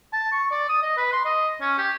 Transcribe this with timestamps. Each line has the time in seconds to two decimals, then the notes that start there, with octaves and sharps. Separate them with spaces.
0.13 A5
0.32 C#6
0.51 D5
0.69 D#6
0.83 D#5
0.97 B4
1.12 C6
1.25 D#5
1.61 C#4
1.78 G4